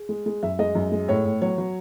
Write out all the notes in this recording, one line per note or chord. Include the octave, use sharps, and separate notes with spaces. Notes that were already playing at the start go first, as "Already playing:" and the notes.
Already playing: G#4
G#3
G#3
F#2 E5
G#3 D#5
F#2
G#3
A2 C#5
A2
F#3 C#5
F#3